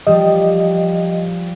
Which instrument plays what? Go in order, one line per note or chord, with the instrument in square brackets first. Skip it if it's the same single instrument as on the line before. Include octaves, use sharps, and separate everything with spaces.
[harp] F3 G3 [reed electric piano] D#5